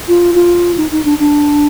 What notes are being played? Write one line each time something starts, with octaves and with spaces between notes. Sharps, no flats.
F4
F4
D#4
D#4
D4
D4